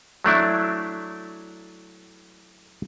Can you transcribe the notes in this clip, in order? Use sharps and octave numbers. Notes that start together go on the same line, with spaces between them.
F#3 A3 D4 E4